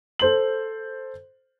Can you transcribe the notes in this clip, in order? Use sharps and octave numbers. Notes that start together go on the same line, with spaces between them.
A4 C5 F#7